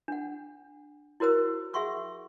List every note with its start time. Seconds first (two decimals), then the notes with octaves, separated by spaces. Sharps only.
0.08 D4 F#5
1.20 E4 F#4 A#4 C5 E6
1.73 G#4 E5 F#5 C6 C#6 E6